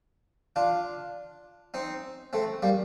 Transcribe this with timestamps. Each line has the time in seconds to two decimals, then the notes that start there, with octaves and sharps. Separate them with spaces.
0.56 D4 F4
1.74 C4 D#4
2.33 A3 C4
2.62 G3 A#3